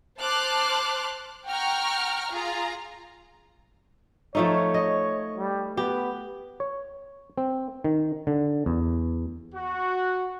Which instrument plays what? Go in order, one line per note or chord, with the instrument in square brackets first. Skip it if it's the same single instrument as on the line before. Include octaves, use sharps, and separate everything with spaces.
[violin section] C5 A5 C6 D6 F6 F#6
F#5 G5 A#5 C#6 F6
F4 G#4 A#5
[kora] F3 A3 D#4 [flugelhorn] C#5
[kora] D#5
[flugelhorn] G3
[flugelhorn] B3 [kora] G4
[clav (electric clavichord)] C#5
C4
D#3
D3
E2
[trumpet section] F#4